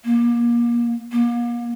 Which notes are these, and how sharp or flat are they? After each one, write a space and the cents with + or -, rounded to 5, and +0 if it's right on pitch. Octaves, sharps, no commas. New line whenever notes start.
A#3 +30
A#3 +35